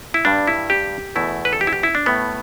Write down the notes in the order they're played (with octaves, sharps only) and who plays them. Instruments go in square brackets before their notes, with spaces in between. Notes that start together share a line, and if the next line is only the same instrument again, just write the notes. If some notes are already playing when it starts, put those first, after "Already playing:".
[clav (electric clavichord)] E4
G2 G3 D4
E4
G4
E2 B2 A3 E4
B4
A4
G4
E4
G4
E4
D4
A2 A3 B3